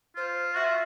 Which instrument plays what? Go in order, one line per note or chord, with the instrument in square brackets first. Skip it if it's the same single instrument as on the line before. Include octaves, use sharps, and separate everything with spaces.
[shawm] F4 [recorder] C5
[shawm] F#4 [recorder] E5
[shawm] F4